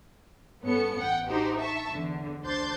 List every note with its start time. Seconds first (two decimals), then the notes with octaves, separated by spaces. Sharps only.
0.63 G2 B3 C#4 A4 C#7
0.98 A1 F#5 G5
1.29 D4 D#4 F#4 G4 C5
1.59 E5 A5 C#6
1.91 E2 D3
2.43 D2 D4 C5 C6 G6 A6